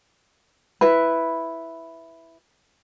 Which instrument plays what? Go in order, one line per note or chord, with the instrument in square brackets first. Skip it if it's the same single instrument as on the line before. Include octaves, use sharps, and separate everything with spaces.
[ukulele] E4 B4